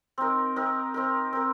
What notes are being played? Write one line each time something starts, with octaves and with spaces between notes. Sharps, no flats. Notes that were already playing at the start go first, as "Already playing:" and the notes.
C4 D#4 A#4
C4 D#4 A#4
C4 D#4 A#4
C4 D#4 A#4